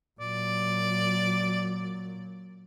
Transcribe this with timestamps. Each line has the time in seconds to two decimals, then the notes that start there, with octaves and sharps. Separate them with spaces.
0.20 A#2 F#3 D5